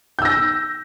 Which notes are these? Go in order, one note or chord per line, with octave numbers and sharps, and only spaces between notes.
E6 G6 A#6